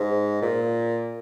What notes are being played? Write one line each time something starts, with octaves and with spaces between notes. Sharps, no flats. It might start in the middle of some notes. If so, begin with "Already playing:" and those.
Already playing: G#2
A#2